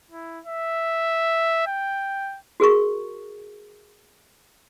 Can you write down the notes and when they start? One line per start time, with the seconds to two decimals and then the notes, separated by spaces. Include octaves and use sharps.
0.11 E4
0.45 E5
1.67 G5
2.60 F#4 G#4 A#4 C#6